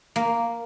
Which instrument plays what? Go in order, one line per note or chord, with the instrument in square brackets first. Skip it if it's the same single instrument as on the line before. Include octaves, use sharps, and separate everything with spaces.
[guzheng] A#3